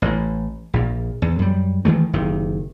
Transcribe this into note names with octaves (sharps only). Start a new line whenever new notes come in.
A1 A2
A#1 A#2
E2
F#2 G3
D#3 E3 F#3 A3
F#1 C3 D#3